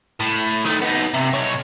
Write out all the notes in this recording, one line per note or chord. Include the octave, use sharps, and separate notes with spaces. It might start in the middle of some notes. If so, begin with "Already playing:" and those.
A2
D#3 A3
B3 D#4
C3
B2 C#5